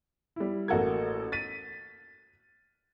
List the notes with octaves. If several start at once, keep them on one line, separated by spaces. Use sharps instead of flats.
G3 E4
A1 A#3 F#4 A4 A#4 G#6
A6 B6 D#7